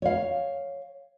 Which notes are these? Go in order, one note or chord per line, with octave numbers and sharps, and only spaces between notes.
C#5 F5